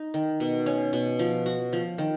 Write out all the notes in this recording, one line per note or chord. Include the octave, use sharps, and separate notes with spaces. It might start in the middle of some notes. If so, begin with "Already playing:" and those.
Already playing: D#4
D#3
B2
C#4
B2
F3
F#4
F3
D#3